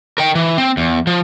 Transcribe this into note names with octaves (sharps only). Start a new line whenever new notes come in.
A#4 G5
E3
C4
E2
F3